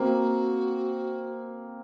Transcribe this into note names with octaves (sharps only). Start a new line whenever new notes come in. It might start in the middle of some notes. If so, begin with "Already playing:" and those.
Already playing: A#3 C4 F#4